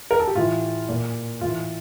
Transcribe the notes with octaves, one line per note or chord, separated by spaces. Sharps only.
A#4
A4
G4
A2 E3 F4
A#2
A2 E3 F4